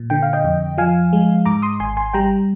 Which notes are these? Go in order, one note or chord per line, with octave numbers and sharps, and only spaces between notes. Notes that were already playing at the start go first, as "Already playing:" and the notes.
Already playing: A#2
D3 G5
F5
D#5 G5
F2
F3 F5 G#5
G#3
G#2 A#5 D6
C6 D#6
G#1 G#5 C6
G#5 C6
G3 G5 A#5